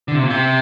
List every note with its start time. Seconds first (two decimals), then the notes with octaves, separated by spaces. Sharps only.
0.08 D3
0.14 C3
0.23 A#2
0.30 C3